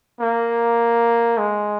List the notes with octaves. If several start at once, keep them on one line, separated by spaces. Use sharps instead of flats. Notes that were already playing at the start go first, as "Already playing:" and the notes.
A#3
G#3